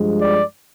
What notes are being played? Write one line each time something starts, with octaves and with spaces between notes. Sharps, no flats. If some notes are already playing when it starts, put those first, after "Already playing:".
Already playing: G2 F3 G#3
D5